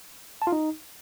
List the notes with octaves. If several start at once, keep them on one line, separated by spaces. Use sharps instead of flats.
A5
F4
D#4